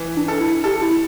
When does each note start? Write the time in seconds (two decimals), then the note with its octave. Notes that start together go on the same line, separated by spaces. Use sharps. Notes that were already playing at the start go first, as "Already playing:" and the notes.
Already playing: E3
0.17 D4
0.28 A4
0.40 E4
0.64 G4 A4
0.82 E4